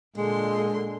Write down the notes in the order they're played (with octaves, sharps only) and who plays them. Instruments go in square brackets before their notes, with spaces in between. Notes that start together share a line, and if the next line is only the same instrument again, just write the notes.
[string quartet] A#2 D3 C6 [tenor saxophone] G#3